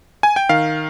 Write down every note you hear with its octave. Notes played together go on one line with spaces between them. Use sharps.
G#5
G5
D#3 F5